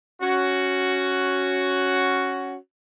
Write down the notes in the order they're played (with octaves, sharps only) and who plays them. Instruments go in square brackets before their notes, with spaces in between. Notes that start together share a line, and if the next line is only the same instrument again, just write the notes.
[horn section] C#4 F#4